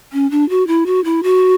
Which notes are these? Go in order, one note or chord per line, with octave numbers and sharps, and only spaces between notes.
C#4
D4
F#4
E4
F#4
E4
F#4